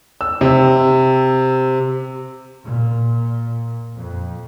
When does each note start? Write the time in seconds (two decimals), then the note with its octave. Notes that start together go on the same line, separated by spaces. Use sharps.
0.21 E6
0.41 C3
2.64 A#2
3.95 F2